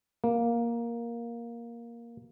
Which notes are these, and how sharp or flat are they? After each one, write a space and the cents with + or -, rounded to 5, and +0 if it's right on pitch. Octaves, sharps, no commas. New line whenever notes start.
A#3 +10